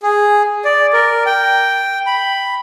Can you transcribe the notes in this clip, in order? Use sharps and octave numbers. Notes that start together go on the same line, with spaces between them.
G#4
D5
A#4
G5
B5